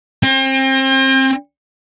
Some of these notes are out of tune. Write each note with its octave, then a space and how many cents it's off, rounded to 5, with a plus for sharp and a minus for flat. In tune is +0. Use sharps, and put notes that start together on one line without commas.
C4 +30 G5 +40